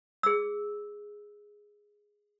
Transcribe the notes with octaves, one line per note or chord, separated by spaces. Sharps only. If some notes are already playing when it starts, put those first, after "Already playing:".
G#4 E6